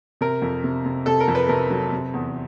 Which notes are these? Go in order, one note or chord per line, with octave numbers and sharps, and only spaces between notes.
C3 A#4
F2
C3
C3
C3 A4
A#4
F2
B4
C3 A#4
F#3
C3
E2